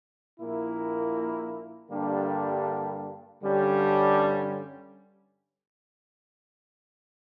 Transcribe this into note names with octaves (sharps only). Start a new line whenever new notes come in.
A#1 A#2 A#3 E4
G2 D3 G3 A#3 D4
G2 D3 G3 C#4